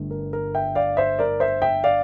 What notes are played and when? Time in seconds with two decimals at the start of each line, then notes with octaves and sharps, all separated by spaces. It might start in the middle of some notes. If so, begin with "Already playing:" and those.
Already playing: G1 G2 D3 A3
0.11 A#4
0.33 A#4
0.55 E5 G5
0.75 D5 F5
0.97 C5 E5
1.19 A#4 D5
1.40 C5 E5
1.62 E5 G5
1.84 D5 F5